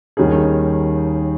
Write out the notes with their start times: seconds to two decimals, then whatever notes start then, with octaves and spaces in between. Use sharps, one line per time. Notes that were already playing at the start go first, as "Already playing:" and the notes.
0.17 D#2 D#3 G3 C#4 G#4